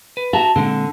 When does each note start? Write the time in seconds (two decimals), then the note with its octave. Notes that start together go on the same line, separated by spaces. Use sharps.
0.17 B4
0.33 F#4 E5 A5 A#5
0.56 A#2 D3 G#3 C4